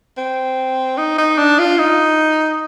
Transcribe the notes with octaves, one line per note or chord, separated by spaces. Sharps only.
C4
D#4
D#4
D4
F4
D#4